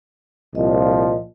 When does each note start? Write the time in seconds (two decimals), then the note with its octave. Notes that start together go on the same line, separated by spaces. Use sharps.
0.55 C2 A#2 F3 D#5